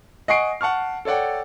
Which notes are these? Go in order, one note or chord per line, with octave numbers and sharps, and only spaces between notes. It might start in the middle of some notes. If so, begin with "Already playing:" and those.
D#5 F#5 G#5 C#6 C7 D7
F#5 A5 C#6 F6
A4 C#5 D5 F#5 G5